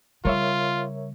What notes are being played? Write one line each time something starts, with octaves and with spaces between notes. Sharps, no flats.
C#3 G3 F4 A#4 C#5 E5